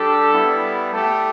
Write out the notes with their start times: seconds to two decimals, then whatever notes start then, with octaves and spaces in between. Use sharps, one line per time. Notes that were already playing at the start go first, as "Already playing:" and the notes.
Already playing: G3 D4 G4 A4
0.31 G3 B3 E4
0.93 A3 G4 A4